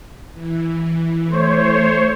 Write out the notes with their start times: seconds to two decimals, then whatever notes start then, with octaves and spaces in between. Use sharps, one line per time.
0.33 E3
1.31 A3 C5 C#5